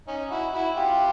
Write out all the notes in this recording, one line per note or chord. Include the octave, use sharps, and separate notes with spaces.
C#4 D#4
E4 F#4
E4 F#4
F4 G4